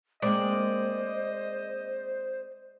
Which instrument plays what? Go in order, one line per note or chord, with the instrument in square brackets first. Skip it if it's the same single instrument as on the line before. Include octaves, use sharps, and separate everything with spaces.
[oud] G#3 A#3 C4 [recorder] C5 [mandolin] D5 [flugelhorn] D#5